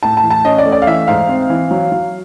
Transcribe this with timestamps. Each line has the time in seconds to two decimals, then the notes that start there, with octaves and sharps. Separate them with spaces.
0.03 A2 A5
0.17 A5
0.24 E3
0.30 A5
0.45 C#4 D#5
0.58 D5
0.66 A3
0.72 D5
0.82 F5
0.87 E3 E5
1.07 G#2 F5
1.28 C4
1.50 E3
1.71 F#3
1.92 F#3